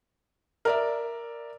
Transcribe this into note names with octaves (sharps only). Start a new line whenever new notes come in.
A#4 D5 E5